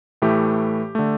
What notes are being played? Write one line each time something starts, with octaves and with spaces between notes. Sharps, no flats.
A2 E3 A3 G4
D3 A3